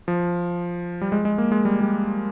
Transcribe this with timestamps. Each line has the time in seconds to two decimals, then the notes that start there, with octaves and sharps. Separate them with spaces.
0.08 F3
1.01 G3
1.12 G#3
1.25 G#3
1.38 A#3
1.52 G#3
1.65 G3
1.81 G3